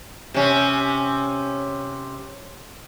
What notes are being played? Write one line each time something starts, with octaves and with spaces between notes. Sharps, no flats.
C3 C#4